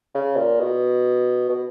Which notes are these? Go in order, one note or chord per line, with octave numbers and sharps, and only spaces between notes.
C#3
A#2
B2
B2